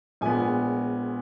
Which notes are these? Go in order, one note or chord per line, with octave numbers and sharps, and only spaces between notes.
A#1 A#2 G#3 B3 G#5